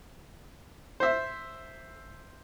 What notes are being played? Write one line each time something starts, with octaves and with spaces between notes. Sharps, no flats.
C5 E5